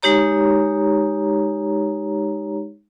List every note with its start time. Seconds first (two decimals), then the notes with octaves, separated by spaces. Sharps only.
0.03 G#3 D#4 G4 C#5 A#5